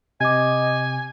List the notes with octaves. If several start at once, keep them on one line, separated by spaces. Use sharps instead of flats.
C3 D#5 G#5 D6 G#6